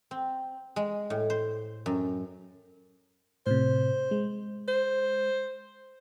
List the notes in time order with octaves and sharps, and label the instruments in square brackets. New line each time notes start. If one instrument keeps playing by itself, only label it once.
[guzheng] C4
G#3
A2
C5
F#2
[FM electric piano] A2 C3 [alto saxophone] C5
[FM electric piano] G#3
[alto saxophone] C5